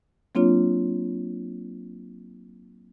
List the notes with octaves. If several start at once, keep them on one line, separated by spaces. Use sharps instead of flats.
F#3 A#3 C4 D4 F4 C#5